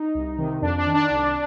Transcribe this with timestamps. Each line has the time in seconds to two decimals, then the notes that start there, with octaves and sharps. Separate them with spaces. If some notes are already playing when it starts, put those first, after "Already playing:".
Already playing: D#4
0.15 C2
0.38 C3 D#3
0.62 F2 D4
0.78 D4
0.86 D#3
0.94 D4
1.10 C2